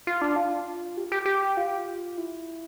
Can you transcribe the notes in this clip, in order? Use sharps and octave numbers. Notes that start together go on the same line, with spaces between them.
F4
D4
F4
G4
G4
G4
F4
E4